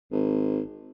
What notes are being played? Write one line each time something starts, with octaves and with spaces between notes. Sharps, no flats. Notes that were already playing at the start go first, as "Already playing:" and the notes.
G#1